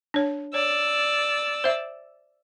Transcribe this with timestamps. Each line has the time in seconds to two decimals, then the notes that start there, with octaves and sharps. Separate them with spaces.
0.14 D4 C#5
0.54 C#5 D5 E6
1.64 C5 E5